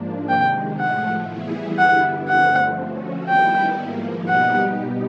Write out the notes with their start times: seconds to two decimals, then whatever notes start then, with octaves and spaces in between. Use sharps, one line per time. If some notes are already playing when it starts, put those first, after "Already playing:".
Already playing: G#2 F3 A#3 D4
0.29 C3 D#3 G#3 G5
0.79 A2 F3 A3 F#5
1.29 E3 G3 B3 E4 G#4
1.78 G2 D3 G3 B3 E4 F#5
2.29 G2 D3 F3 A3 C4 F#5
2.79 F3 A3 C#4 F#4
3.28 D#3 G3 B3 E4 G5
3.78 G#2 F3 A#3
4.28 B2 G3 B3 D#4 G4 F#5